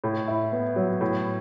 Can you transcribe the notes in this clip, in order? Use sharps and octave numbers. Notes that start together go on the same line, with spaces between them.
A2
E4
B3
F#3
A2